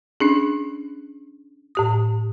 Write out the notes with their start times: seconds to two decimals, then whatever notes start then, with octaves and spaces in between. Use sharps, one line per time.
0.20 C#4 D4 G#4
1.75 A2 G4 D#6